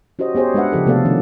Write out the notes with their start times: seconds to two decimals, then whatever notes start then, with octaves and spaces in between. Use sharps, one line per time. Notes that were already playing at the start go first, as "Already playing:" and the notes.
0.19 C#4 F#4 G4 C5 D#5
0.35 B3 G4 G#4 C5 C#5
0.54 G#3 D4 B4 E5 F#5
0.72 C#3 F3 G4 A4
0.86 C3 A3 B3 A4 D5 F5
1.05 D#3 F3 C#4 D4